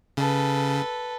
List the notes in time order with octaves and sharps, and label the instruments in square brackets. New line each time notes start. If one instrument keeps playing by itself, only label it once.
[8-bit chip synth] C#3 [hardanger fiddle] A4 B4